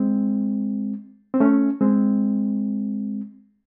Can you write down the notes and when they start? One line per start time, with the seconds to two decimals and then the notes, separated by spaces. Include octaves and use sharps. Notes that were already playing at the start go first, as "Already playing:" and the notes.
Already playing: G#3 C4
1.34 C4
1.40 A3 C#4
1.81 G#3 C4